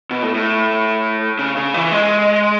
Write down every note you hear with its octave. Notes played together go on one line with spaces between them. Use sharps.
B2
A2
A2
C#3
C#3
E3
G#3